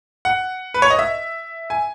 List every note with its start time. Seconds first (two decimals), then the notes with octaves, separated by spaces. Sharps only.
0.25 F#5
0.74 B4
0.82 C#5
0.90 D#5
0.99 E5
1.70 G#5